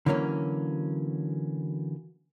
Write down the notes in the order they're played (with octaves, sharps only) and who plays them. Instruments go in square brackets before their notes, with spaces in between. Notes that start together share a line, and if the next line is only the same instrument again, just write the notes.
[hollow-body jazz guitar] D3 E3 F#3 A#3 C4 C#4